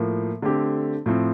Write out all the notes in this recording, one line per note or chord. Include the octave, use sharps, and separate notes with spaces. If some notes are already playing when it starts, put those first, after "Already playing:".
Already playing: A2 F3 A#3
D3 A3 C4 G4
A2 F3 C4